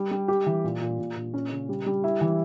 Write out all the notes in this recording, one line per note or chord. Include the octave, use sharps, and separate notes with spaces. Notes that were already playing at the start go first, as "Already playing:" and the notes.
Already playing: G3
G3
G4
E3
A#2
A#2
A#2
A#2
C#4
C#3
G3
G3
E4
E3